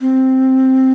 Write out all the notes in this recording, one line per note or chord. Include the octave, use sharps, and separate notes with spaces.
C4